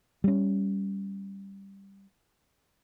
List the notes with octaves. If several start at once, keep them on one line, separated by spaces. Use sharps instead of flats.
G3 C#4